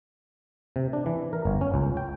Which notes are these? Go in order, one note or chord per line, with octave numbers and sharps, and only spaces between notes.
C3
D4
E3
A#4
G1
C#4
C#2
G5